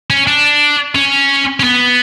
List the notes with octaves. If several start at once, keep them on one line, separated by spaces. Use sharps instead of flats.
C#4
D4
C#4
C#4
B3